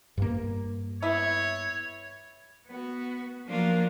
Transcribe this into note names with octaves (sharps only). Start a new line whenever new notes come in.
G2 A#3
B3 E4 C#5
B3 F#4
F3 F#3 A#3 D4 F4 A#4